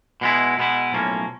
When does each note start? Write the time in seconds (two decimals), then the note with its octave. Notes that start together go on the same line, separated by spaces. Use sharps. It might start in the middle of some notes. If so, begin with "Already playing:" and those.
0.21 B2 G#3 B3 E4
0.58 B2 G#3 B3 E4
0.92 B1 A2 F3 A#3 C#4